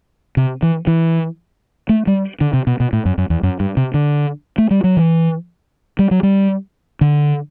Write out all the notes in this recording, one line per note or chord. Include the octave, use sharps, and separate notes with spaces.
C3
E3
E3
A3
G3
D3
C3
B2
B2
A2
F#2
F#2
E2
F#2
G2
C3
D3
A3
G3
F#3
E3
G3
F#3
G3
D3